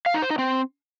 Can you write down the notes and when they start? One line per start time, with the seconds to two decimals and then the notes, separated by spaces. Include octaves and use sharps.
0.06 F5
0.14 D#4
0.22 C5
0.30 D#4
0.39 C4